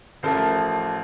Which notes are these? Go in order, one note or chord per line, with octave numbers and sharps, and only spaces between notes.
A1 F3 A3 A#4